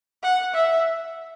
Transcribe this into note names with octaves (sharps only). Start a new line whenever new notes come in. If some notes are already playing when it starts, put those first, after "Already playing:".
F#5
E5